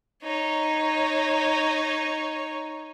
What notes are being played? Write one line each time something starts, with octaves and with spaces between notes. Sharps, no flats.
D#4 C#5